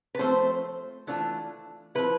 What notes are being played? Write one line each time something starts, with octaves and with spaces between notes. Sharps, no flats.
B4
D3 F3 A3 C4 C5
E3 A3 D4 F4
F3 C4 E4 B4